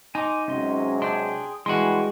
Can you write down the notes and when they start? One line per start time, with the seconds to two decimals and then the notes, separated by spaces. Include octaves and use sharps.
0.15 D#4 G#5 C6 D6
0.48 C3 F#3 G#3 C#4 D#5 C6
1.02 D4 G#4 G5 C6
1.66 E3 G3 G#3 D4 F#4 F#5 G#5 C6